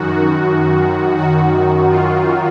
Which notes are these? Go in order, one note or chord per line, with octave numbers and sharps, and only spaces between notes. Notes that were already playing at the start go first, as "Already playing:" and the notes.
Already playing: F#2 D#3 F#4
F#4
F4